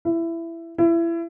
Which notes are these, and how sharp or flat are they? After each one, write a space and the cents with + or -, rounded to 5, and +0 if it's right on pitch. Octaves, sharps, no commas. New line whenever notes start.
E4 +15
E4 +25